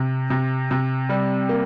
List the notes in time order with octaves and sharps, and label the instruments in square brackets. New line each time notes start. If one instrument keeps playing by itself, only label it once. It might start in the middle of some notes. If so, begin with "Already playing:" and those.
Already playing: [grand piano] C3
C3
C3
G3
A#3